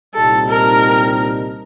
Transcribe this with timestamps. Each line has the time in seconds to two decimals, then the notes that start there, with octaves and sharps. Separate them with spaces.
0.14 C2 A#2 G3 C4 D#4 A4
0.49 A#4